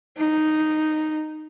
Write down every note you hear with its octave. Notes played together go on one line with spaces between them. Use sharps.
D#4